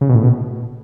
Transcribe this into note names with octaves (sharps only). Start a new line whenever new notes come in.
C#3
B2
A2
B2